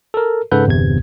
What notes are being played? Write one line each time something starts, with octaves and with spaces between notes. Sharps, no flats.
A4 A#4
G#2 C#3 A4 B4 F#5 G6
G1 E2 C3 G#6